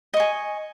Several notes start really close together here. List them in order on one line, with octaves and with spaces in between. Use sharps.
D#5 C#6 G#5